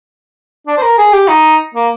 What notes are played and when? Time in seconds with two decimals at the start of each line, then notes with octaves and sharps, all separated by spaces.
0.67 D4
0.78 C5
0.82 A#4
0.98 G#4
1.12 G4
1.28 D#4
1.74 A#3